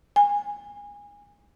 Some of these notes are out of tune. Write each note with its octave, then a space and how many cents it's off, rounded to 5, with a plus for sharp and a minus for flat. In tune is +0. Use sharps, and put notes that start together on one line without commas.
G#5 -25